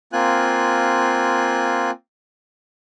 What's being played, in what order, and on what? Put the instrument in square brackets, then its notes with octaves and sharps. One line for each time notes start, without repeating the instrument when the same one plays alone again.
[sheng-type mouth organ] A#3 C4 F4 G#5 F#6